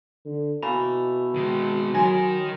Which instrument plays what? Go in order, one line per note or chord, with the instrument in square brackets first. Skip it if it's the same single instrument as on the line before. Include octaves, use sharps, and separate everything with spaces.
[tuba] D3
[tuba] B2 [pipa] E3 A3 A#3 [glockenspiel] B5
[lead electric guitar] D#3 G#3
[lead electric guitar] D#3 A#4 [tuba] F#3 [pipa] G#5 [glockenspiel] C6 A#6